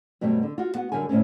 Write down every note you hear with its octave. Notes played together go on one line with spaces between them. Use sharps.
G2 B2 F#3 G3 A3 C4
D3
F4 F#4
B3 F#4 F#5
F#2 A#2 D3 G3 A#4 G#5
D2 A2 C4 C#4